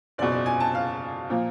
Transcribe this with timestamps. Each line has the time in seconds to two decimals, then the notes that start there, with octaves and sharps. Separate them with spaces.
0.18 F#1 E2 B2 D5
0.32 D5
0.46 G#5
0.60 A5
0.75 F5
1.30 A#2 F3 A#3